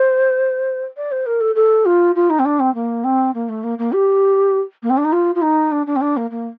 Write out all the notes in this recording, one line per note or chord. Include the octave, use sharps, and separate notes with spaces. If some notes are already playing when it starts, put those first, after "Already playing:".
Already playing: C5
D5
C5
A#4
A4
A4
F4
F4
D#4
C4
D4
C4
A#3
C4
A#3
A3
A#3
A#3
G4
A#3
C4
D4
D#4
F4
F4
D#4
D4
D4
C4
D4
A#3
A#3